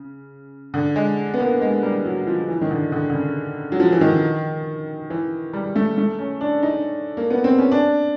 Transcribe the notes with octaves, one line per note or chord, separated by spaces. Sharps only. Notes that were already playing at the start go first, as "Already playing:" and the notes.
Already playing: C#3
D3
G#3
B3
A#3
G#3
G3
F#3
F3
E3
D#3
D3
D3
D3
C#3
F#3
F3
E3
D#3
E3
G3
A3
A3
C#4
D4
D#4
A#3
B3
C4
C#4
D4